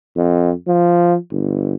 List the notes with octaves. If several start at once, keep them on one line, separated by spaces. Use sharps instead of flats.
F2
F3
G1